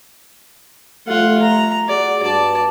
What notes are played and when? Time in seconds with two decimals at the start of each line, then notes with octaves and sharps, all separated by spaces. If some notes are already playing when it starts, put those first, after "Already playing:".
1.08 F3 G3 A3 F4 F#5
1.42 A#5
1.89 F#4 G#4 D5
2.22 G2 F#4 D5 A5